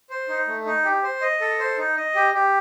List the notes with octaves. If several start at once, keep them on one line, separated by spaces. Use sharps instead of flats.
C5
D#4
A3
D#4
G4
C5
D#5
A4
C5
D#4
D#5
G4
G4